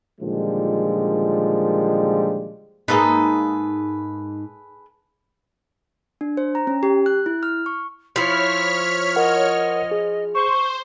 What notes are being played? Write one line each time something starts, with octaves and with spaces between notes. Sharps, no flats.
A#2 D3 D#3 F3 G3 G#3
G#2 A#3 D#4 G#4 A4 B4
D4
C5
A#5
C#4
G4
F#6
E4
F6
C#6
F3 E4 C#5 F6 B6
A#4 D#5 F#5
G#4
C5 C#6